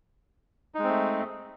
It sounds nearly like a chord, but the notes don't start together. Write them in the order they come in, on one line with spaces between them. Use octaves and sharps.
D#4 G#3 C4 A3